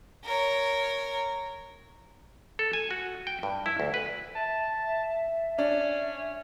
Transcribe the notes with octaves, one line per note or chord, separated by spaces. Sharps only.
A#4 C#5
A4
G#5
F#4
G5
G2
E4
D2
B4
E5 A5
C#4 D4